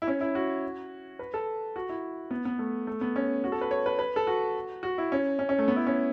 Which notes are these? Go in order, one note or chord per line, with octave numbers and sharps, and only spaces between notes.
E4
C#4
E4
F#4
B4
A4
F#4
E4
B3
B3
A3
A3
B3
C#4
F#4
A4
B4
C#5
B4
B4
A4
F#4
F#4
E4
C#4
C#4
C#4
A3
B3
E4
C#4